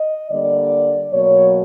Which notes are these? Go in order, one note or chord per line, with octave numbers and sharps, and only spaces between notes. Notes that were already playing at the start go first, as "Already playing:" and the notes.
Already playing: D#5
D3 G3 A#3 D5
B2 F#3 A#3 C#5